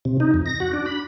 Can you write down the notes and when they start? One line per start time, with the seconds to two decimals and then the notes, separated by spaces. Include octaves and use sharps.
0.05 C3
0.20 D#4
0.34 F2
0.46 A#6
0.60 F#4
0.73 D4
0.86 B5